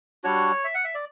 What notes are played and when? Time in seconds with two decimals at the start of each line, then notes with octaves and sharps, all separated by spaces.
0.24 G3 D4 F#4 C#5
0.64 E5
0.74 F#5
0.84 E5
0.94 D5